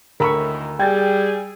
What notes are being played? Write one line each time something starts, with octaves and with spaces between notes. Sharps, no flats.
D2 A2 D#3 A#4 A#5 B5 C#6 E6
G3 G#4 G5 G#6 A6